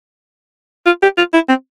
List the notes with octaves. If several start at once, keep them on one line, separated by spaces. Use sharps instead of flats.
F4
G4
F4
E4
C4